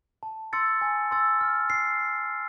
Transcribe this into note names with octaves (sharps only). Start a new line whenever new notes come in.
A5
C6 E6 A6 C#7
G#5
C6 E6 A6
F6
C7